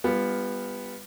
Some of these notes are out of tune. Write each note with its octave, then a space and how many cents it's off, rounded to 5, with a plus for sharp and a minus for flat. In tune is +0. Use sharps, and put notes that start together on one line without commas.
G3 +35 B3 +0 F4 +0